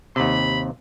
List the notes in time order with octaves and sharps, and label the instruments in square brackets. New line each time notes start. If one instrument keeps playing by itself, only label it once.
[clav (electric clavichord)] D#2 C3 [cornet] B5